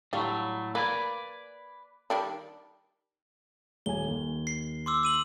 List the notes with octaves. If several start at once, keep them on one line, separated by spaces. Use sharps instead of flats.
A2 F#3 G3 A3 D4 F4
A#3 B4 D5 G#5
D#3 G3 D4
D#1 G#5 G7
D#2
C7
C6 D6 E6
E6 D#7 F#7